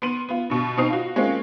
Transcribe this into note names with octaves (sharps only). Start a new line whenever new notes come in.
B3 C6 D#7 F#7
B3 F4
G2 B2
B2 C4 D#4 D#6 C7 F7
F4 F#4
G#3 A#3 C4 C#4 F4